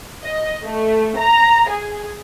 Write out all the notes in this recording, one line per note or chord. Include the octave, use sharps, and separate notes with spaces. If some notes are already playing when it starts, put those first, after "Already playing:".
D#5
A3
A#5
G#4